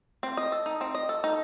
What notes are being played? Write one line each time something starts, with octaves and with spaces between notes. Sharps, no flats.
C4
D#5
A4
D#4
C4
D#5
A4
D#4